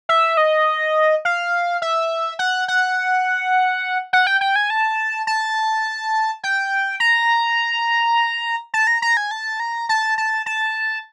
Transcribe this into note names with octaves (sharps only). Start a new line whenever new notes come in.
E5
D#5
F5
E5
F#5
F#5
F#5
G5
G5
G#5
A5
A5
G5
A#5
A5
A#5
A#5
G#5
A5
A#5
A5
A5
A5